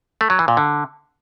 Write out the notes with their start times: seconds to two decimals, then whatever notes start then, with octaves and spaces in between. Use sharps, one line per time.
0.21 A3
0.30 F#3
0.39 E3
0.48 A#2
0.57 D3